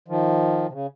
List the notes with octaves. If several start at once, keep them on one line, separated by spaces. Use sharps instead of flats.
D#3 F3
C3
C#3